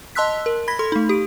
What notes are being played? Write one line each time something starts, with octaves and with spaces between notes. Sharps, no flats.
D#5 A5 C6 E6 F#6 B6
A#4
B5 G#6 A#6 B6
A4 C6
A3 D#4
G4 D7